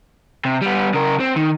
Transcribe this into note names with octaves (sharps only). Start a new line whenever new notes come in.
C3
G3 B3
C#3 A#4
C4
D#3